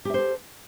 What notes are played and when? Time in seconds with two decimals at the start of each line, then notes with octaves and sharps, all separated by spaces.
0.05 G4
0.10 E5
0.14 C5
0.18 A4